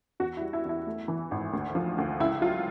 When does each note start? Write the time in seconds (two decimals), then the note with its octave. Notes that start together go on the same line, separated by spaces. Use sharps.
0.20 E2 F#4
0.37 E4
0.41 G3
0.53 E4
0.65 E2 E4
0.87 A3
1.08 E3
1.31 G#1
1.53 D2
1.75 F3
1.98 D2
2.20 C#2 E4
2.42 F#3 F4